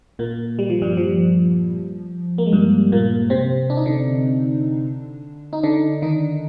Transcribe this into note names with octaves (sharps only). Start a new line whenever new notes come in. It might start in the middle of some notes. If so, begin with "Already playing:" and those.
A#2 A#3
G3
F3
G2 G3
F3
A#3
G#3
G2 G3
A#2 A#3
C3 C4
D4
D#4
D3 D4
D#4
D3 D4
D#3 D#4